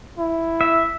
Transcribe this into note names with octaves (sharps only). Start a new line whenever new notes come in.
E4
E5